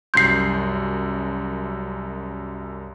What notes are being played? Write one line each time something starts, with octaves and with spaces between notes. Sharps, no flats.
C2 F#2 C6 G6 C7